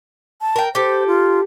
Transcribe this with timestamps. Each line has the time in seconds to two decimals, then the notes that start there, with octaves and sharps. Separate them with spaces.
0.41 A5
0.56 A#4 G5
0.75 G4 A4 C5
1.07 F4